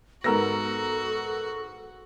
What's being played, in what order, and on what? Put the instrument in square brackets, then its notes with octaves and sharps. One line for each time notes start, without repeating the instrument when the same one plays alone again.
[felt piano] G#2 E6 A#6 [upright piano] B3 A#4 [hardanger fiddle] F#4 [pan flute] A4